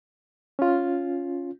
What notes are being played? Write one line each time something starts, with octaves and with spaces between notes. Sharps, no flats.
C#4 F4